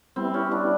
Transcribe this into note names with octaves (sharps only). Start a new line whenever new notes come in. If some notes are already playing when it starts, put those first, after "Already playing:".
G3 B3 C4 E4
C#4
D4